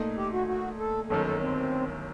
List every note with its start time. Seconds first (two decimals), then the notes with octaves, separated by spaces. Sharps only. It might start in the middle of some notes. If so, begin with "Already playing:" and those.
Already playing: A#2 A3 D#4
0.17 G4
0.32 F#4
0.47 F#4
0.79 A4
1.10 G1 F#2 D#3 A4
1.26 A4
1.41 C4